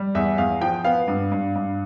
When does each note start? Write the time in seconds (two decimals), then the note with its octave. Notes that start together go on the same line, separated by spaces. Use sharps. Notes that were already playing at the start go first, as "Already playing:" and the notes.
Already playing: G3
0.15 E2 E5
0.38 E2 F5
0.61 F3 G5
0.84 B3 F5
1.08 G2
1.31 G2
1.55 G2